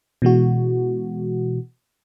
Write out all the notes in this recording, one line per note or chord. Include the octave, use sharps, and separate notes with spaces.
B2 E3 G#3 F#4